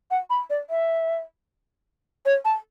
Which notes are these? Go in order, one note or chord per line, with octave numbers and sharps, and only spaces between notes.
F#5
B5
D5
E5
C#5
A5